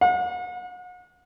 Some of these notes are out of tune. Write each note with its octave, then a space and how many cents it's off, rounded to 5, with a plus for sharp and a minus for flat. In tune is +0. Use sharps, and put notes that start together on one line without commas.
F#5 -40